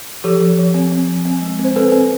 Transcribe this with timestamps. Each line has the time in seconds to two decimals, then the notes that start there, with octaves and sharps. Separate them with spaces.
0.24 F3 G4 A4
0.41 F3
0.58 F3
0.74 C4
0.92 C4
1.08 F3
1.25 C4
1.42 G#3
1.59 C4
1.64 C5
1.76 C4 A4 B4
1.92 C4